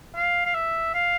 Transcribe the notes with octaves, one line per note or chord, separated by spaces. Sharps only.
F5
F5
E5
F5